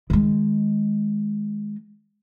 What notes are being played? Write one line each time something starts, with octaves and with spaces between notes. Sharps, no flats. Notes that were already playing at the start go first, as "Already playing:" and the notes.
D#3 G#3